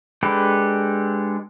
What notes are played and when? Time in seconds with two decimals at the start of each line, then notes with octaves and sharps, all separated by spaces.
0.23 G#3 D4 G4 A4 B4